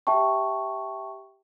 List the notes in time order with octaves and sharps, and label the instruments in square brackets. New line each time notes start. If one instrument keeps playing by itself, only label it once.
[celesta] G4 E5 G5 A5 C#6